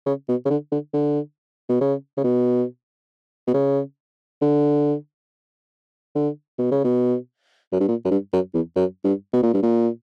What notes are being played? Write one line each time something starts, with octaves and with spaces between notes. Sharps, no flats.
C#3
B2
C#3
D3
D3
D3
B2
C#3
C#3
B2
B2
C#3
D3
D3
B2
C#3
B2
F#2
G2
A#2
F#2
G2
F#2
E2
F#2
G2
B2
A#2
G2
A#2